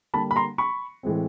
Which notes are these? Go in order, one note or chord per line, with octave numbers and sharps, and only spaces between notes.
D3 G3 A#3 A5 B5
B5
A#5 C6
B5 C#6
A2 E3 G#3 C4